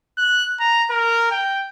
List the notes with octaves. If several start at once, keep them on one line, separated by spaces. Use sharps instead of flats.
F#6
A#5
A#4
G5